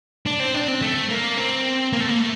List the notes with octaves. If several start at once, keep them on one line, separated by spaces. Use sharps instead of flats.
D4
C4
D4
C4
A3
A#3
C4
A#3
A3
A#3
A3